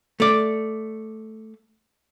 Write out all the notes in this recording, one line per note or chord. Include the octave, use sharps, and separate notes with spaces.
A3 D5